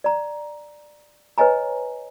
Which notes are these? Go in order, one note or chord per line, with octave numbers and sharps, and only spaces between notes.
D5 A#5
B4 C#5 D#5 G#5 A#5